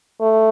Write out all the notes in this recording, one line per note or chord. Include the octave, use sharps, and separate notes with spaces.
A3